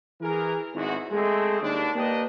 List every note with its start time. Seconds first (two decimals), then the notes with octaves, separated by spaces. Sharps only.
0.21 E3 G#4 A#4
0.74 G#1 E2 G#2 E4 F#4
1.12 G#3 A3 C4
1.61 D#2 D4
1.95 A#3 D4 G4 B4 D#5